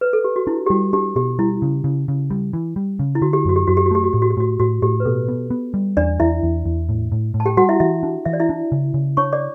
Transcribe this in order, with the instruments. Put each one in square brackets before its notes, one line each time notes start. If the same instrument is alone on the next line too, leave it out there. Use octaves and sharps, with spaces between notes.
[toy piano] B4
A4
G4
F#4
[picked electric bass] D4 [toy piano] E4
[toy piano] G4
[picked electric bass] G3 [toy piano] F#4
[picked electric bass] D4 [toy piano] G4
[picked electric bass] B2 [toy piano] G4
[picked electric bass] G3 [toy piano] E4
[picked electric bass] C#3
C#3
C#3
G3
E3
G3
C#3
[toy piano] E4
[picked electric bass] D3 [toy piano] F#4
[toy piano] G4
[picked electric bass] F#2 [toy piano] F#4
[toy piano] G4
[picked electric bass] F#2 [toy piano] F#4
[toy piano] G4
F#4
[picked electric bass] A3 [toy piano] G4
[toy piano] F#4
[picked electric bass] A2 [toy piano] G4
[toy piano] F#4
G4
[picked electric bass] A2 [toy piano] F#4
[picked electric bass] A2 [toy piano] F#4
[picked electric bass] A2 [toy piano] G4
[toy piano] B4
[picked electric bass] B2 [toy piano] A4
[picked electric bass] B3
B3
G3
[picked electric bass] E2 [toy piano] D4 D5
[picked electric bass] E2 [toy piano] E4 E5
[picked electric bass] E2
E2
A2
A2
A2
[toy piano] A5
G4 G5
[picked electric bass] G3 [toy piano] F#4 F#5
[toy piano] E4 E5
[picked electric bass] E3 [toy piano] E4 E5
[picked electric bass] D4
[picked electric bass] E3 [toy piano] E5
[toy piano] D5
E4 E5
[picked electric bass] D4
C#3
C#3
[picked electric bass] D4 [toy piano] C#5 C#6
[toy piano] D5 D6